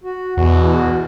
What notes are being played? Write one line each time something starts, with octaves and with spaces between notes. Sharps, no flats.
F#4
E2 B2 F#4